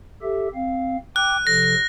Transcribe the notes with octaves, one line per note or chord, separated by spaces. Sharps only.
G4 A4 E5
C4 F5
G5 D6 F#6
C3 F3 A4 A#6